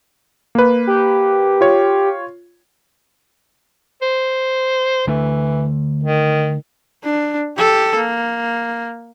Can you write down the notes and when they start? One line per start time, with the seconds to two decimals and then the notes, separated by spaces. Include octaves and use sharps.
0.55 A#3 B4
0.87 G4
1.61 F4 C#5
4.02 C5
5.07 D3 E3 A3
6.03 D#3
7.04 D4
7.57 G4 A4
7.95 A#3